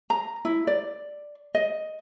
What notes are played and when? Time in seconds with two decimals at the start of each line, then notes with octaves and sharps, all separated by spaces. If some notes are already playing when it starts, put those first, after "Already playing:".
0.10 A#5
0.45 E4
0.67 D5
1.55 D#5